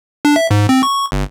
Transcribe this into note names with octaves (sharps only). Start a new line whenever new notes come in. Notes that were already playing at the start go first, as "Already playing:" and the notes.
D4
E5
G#2
C4
C#6
G1